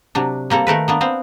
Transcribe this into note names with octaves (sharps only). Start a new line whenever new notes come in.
C3 F#3 D4
G3 A#3 C4 A4
D#3 A3 A#4 B4
A#3 B3 D4
B3 C4 F5